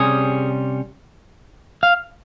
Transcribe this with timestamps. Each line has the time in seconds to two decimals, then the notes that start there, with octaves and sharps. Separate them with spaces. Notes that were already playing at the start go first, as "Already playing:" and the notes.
Already playing: C3 G3 C#4 G#4
1.83 F5